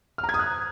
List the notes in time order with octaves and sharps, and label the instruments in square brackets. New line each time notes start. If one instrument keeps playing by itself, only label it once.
[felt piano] F6
A#5
G#6
D#6
F#6